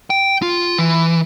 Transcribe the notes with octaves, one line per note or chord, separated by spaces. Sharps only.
G5
F4
E3